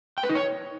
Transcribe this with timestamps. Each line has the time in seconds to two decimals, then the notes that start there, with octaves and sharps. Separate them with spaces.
0.18 G5
0.23 B4
0.29 D#4
0.35 C#5